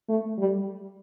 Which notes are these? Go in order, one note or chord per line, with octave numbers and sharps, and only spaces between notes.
A3
G3